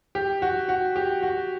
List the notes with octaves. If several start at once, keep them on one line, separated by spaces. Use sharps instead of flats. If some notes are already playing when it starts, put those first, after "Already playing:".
G4
F#4
F#4
G4
F#4